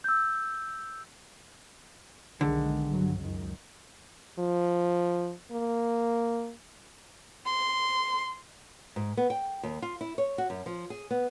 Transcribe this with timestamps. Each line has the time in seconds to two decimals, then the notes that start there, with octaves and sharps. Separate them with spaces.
0.04 E6 G6
2.41 B1 D3 D#3 G#3
2.88 G2 F#3
3.19 C#2 F#2 D#3
4.39 F3
5.52 A#3
7.46 C6
8.96 G#2
9.17 B3
9.30 G5
9.63 D#2
9.82 F4
10.01 E4
10.18 C#5
10.38 F#4
10.50 F#2
10.66 F3
10.90 G#4
11.11 B3